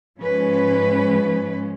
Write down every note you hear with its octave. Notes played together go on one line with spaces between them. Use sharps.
G#2 F3 G#3 C#4 B4